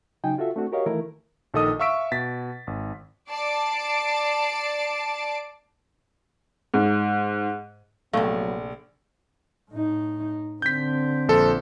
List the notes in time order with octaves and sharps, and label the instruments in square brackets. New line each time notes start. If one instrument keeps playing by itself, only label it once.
[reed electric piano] C#3 F#3 D#4 G5 G#5
F4 F#4 A4 E5
A3 C4 D4 F#4
F#4 G4 A#4 C#5 D#5 F5
D#3 E3 A3 E4 A#4
[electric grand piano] A#1 D#3 A4 D#5 D#6
E5 F5 C#6 E6 B6 D7
B2 A6 B6
G#1
[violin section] D5 A5 C7 D7
[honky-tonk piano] G#2
[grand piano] A#1 [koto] C3 A3 [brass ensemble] F#3 B3 [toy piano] F5
[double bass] A2 D#4
[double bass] D3 C4 [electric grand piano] G6 B6
[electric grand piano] A#1 A4 C5